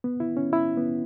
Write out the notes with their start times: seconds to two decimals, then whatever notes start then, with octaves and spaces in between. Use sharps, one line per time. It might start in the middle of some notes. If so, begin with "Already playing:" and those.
0.04 B3
0.20 E4
0.37 C#4
0.53 E4
0.77 B3